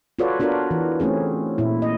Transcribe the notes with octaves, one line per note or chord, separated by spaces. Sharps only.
F4 F#4 A4 B4 C#5 D5
B3 D4 F4 F#4 A#4
E3
A3 C4 C#4 G#4
A#2 E4
D#5